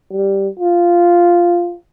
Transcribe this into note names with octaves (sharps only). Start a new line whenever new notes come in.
G3
F4